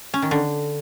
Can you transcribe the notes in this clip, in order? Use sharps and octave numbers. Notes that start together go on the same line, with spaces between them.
C#4
D#3
D3